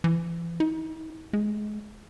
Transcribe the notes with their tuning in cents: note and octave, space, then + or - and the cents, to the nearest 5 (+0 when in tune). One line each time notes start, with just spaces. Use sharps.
E3 +40
D#4 +45
G#3 +25